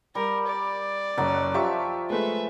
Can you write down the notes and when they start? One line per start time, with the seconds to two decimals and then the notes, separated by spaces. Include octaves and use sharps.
0.15 G3 A#4
0.47 D5
1.18 F#1 F#3 F#4 D#5
1.54 F3 G4 E5 C#6
2.10 G#3 A3 B4 E5